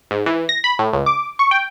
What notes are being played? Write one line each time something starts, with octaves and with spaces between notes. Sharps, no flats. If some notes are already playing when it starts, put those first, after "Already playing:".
G#2
E3
A#6
B5
A2
C#2
D6
C#6
G5